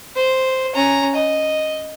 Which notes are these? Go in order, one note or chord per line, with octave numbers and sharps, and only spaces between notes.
C5
C#4 A#5
D#5